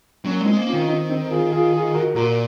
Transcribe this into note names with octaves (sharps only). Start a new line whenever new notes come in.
F#3 A#3 C#4
G#3 C4 D#4
A#3
C#4 F4
D#3
C4 D#4
C4 D#4
A#4
F4 G#4
F4 G#4
F4 G#4
F#4 A#4
A#2 F#4 A#4